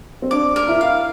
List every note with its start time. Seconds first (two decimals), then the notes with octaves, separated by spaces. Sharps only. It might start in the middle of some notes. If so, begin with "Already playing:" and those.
0.22 C4
0.31 D4 D6
0.56 A#4
0.68 E4
0.81 F5